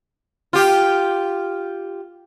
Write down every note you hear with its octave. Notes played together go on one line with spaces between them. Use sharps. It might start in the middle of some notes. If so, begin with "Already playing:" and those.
F4 G4